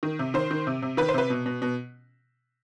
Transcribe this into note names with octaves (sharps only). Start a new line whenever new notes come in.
D#3
C3
D#3 C5
D#3
C3
C3
D#3 B4
C5
C3 B4
B2
B2
B2